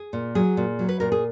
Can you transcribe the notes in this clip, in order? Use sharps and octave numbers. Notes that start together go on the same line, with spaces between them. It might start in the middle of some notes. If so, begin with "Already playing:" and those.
Already playing: G#4
A#2
F#3 G#4
A#2
F#3
B4
A#2 A#4
G#4